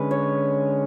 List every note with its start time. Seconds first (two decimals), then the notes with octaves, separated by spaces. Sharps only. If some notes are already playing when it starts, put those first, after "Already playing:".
Already playing: D3 G#3 C#4 B4
0.11 C#5